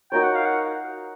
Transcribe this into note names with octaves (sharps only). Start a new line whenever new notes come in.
D#4 F#4 A#4 C#5 G5
F#5
F5
F#5